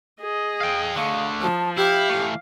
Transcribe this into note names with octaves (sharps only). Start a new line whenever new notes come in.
G#4 D#5
F5 G5
D3 A3 F5
F3 A5
E4 G4 F5
E3 A3